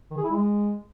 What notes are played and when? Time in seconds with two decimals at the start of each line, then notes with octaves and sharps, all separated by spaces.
0.11 D#3
0.17 G#4
0.24 E4
0.31 G#3